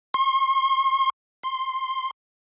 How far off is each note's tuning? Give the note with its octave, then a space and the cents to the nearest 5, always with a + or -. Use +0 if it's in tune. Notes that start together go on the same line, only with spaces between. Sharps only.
C6 +45
C6 +10